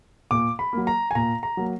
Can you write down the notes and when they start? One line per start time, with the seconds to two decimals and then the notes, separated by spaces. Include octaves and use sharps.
0.31 A#2 D6
0.59 B5
0.73 F#3 A#3
0.87 A#5
1.11 G#5
1.15 A#2 A#5
1.43 A#5
1.57 F#3 A#3